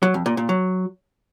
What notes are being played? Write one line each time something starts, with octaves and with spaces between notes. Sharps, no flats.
F#3
F2
A#2
A#2
F#3